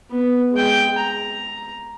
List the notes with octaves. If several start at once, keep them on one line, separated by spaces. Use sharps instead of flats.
B3
G#3 G5
A#5